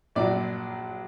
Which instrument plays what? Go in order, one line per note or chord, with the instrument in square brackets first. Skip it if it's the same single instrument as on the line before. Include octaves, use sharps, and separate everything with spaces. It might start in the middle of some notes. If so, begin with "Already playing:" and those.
[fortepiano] A#1 A#2 F#3 D5